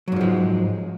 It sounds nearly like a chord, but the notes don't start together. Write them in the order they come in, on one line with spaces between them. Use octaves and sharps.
F#3 G#2 F3 G#3